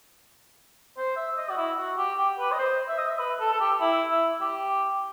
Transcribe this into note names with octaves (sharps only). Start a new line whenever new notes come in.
C5
E5
D#5
F#4
E4
F#4
G4
G4
B4
D#5
C5
E5
D#5
E5
B4
A4
A4
G4
E4
E4
G4